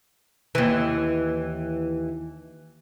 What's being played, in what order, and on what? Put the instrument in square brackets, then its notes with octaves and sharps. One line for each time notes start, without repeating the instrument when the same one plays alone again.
[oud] D#2 E3